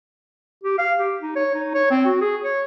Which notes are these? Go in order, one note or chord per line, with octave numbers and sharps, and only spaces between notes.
G4
F5
G4
D#4
C#5
D#4
C#5
C4
F#4
G#4
C#5